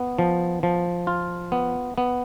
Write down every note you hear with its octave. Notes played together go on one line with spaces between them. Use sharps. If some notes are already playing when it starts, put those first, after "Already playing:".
Already playing: B3
F3
F3
F4
B3
B3